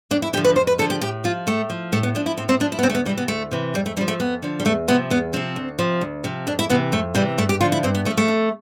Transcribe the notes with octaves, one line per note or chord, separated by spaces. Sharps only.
F2 D4
E4
D3 F3 G4
B4
F2 C5
B4
D3 F3 A4
G4
A2 G4
F3 F4
A2 A3
F3
A2 A3
B3
F3 D4
E4
A2 C4
C4
F3 D4
E4
B3
D2 C4
A3
B3
C3 E3 G3
B3
D2 A3
C3 E3
F2 G3
A3
D3 G3
F3
A3
F2 B3
D3 F3
G3
E2 A3
C3 F3 B3
E2 B3
C3 F3 C4
D2
C3 F3
D2
C3 F3
F2 D4
E4
C3 E3 B3
F2 A3
C3 E3 G3
G2 A3
G4
D3 F3 F4
E4
G2 C4
B3
D3 A3
F3
A3
F2